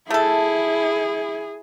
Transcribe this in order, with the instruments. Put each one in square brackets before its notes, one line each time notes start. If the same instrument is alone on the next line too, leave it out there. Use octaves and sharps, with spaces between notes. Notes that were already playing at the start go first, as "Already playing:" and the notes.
[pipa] A3 A4 [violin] E4 [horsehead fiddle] G#4